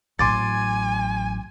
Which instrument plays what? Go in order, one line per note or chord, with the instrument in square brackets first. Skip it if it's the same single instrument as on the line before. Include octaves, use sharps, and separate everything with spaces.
[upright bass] A1 F#3 [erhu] G#5 [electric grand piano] C6 D6 A6